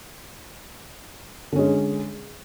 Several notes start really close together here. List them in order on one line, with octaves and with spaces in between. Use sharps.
D3 C#4 G#3